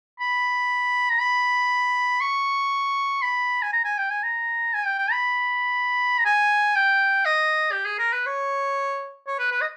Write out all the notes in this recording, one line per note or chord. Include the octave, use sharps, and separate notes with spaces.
B5
A#5
B5
C#6
B5
G#5
A#5
G#5
G5
G#5
A#5
G#5
G5
G5
B5
A#5
G#5
G5
D#5
G4
G#4
A#4
B4
C#5
C#5
B4
B4
D#5